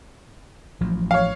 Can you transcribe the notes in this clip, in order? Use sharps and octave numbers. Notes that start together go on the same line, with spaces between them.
A1 F3 F#3
C#5 F5